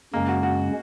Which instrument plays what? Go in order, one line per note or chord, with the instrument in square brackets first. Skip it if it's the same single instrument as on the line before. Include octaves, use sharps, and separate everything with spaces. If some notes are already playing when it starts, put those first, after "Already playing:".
[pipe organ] F#2 C#3 G#3 C#4 [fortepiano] A#3
[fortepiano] F#4
F#4